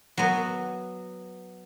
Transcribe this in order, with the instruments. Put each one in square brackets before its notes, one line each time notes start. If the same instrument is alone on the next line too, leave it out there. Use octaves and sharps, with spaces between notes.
[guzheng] F#3 B3